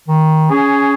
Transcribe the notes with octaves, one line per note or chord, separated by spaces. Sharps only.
D#3
C#4 G#4